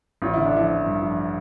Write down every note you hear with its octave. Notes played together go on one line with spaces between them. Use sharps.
A1 F4
D3 E4
D4
F3 E4
F3
G2
F3